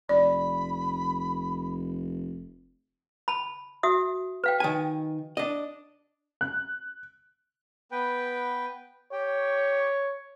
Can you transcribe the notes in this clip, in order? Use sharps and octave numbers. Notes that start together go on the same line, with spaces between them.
F1 D5 B5
A5 B5
F#4 E5 D#6
B4 F5 G5
D#3 G#5
D4 D#5
F#6
B3 B4 G5
G4 C#5 G5